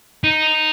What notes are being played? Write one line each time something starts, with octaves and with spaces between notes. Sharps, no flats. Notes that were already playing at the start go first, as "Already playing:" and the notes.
D#4